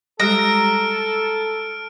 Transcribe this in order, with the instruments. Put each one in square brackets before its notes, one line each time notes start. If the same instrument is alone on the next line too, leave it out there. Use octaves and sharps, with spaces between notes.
[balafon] G3 G#3 G4 [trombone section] A4 [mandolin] A#5 [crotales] F6 D7